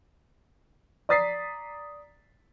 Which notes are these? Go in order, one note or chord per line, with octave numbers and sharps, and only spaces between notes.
D5 A#5 D#6 A6 B6 C7